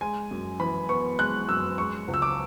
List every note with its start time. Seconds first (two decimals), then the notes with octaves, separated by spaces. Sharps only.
0.01 G#3 G#5
0.31 F#2
0.60 E3 B5
0.89 B3 C#6
1.18 G#3 F#6
1.48 F#2 E6
1.78 G#3 C#6
2.08 C#2
2.14 E6
2.22 D6